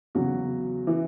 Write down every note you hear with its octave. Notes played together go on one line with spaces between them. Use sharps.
E2 C#3 F#3 F#4
E3